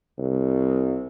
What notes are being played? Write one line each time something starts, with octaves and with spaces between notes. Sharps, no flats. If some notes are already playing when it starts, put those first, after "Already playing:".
C2